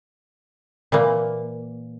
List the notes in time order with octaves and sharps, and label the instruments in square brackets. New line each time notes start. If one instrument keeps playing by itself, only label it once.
[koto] A#2 E3 A#3